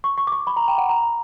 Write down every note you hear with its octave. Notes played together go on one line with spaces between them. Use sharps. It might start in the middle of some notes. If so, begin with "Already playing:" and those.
C#6
C#6
D6
C#6
B5
A#5
G5
F#5
A#5